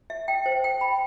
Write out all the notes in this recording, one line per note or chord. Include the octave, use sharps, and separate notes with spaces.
E5
G5
C5
G5
B5